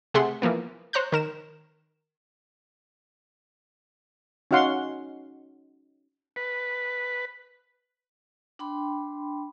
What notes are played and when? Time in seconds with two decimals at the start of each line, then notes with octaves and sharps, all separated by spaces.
0.14 C3 A3 G#4 F#5 C6
0.42 E3 F3 A#3 B3
0.93 C5 C#5 A#5 F#6 G6
1.12 D#3 A#4 E7
4.51 C#4 D#4 F#4 F5 F#5 C6
6.36 B4
8.59 D4 G5 B5 C6